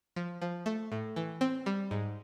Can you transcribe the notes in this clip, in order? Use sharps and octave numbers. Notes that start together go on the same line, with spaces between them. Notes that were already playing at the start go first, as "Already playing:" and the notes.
F3
F3
A3
A2
E3
C4
G3
G#2